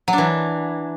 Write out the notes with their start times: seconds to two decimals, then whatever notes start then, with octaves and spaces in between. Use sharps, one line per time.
0.08 F#3
0.13 D4
0.18 E3